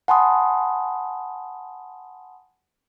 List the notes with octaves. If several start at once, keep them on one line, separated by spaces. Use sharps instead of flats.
F#5 G#5 A5 B5 C6 D#6